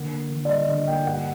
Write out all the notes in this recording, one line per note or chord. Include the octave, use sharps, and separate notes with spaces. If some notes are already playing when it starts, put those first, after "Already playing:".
Already playing: D3 A#3 F#5
A#3
D3
D5
G3 D#5
D3 D#5
A#3 G5
G2 F#5